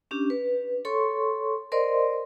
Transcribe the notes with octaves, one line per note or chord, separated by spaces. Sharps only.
C#4 D4 G4
B4
A4 C#5 C6 C#6
A#4 C5 D5 D#5 C6